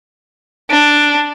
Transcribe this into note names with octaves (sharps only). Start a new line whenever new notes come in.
D4